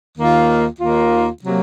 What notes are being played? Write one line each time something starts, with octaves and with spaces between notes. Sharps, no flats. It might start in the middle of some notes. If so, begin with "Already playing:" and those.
D#2 D#3 A#3 F4
D#2 D#3 A#3 F4
C3 F#3 A#3